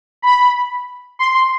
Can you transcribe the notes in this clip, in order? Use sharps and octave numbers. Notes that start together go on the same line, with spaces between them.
B5
C6
C6